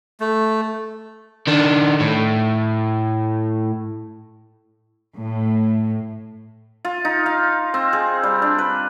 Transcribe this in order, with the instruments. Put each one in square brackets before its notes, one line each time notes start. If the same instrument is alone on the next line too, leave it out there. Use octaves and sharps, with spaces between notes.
[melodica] A3
[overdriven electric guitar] D#3 D4
A2
[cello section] A2
[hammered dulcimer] F4
D#4
F5
C4
G#4
G3
D4
B4